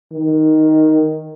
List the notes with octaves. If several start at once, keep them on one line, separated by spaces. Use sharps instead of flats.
D#3